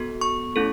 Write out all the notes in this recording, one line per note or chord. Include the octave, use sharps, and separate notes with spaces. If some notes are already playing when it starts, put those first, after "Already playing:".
Already playing: B3 F#4 A4
C#6
A3 C#4 E4 A4